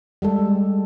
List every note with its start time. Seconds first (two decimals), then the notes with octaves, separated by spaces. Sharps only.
0.22 G3 G#3 A4